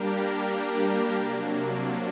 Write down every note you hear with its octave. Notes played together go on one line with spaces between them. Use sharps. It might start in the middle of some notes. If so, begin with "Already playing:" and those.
Already playing: G3 A#3 D4 G4 A#4
C3 F#3 A#3 D4